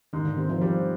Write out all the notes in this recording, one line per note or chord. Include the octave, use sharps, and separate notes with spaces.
G#2 D#3
D3
D#3 C4
F3
F3 G3